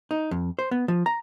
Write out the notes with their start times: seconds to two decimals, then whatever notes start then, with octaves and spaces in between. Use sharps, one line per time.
0.11 D#4
0.31 F2
0.59 C5
0.71 B3
0.88 F3
1.06 A#5